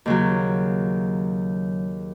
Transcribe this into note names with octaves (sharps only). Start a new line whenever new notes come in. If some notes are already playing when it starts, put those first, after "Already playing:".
D#2 C#3 F#3